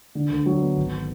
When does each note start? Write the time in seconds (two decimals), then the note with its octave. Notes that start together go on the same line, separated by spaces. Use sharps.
0.15 D3
0.31 D2
0.46 F#3
0.62 B3
0.77 G#1